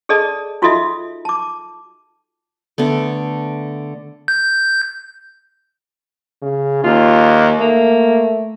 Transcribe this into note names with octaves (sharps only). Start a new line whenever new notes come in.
G#4 A4 D5 D#5 A5
D#4 F4 F#4 A4 D#5 E5
A5 D6
D3 A3 B3
G6
C#3
D#2 F4
A3 A#3